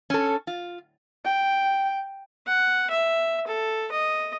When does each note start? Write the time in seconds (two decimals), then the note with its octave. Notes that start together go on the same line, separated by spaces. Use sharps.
0.10 C#4 A4
0.47 F4
1.25 G5
2.47 F#5
2.90 E5
3.47 A4
3.92 D#5